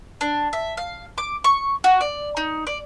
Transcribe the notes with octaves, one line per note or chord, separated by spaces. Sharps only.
D4
E5
F5
D6
C#6
F#4
D5
D#4
D5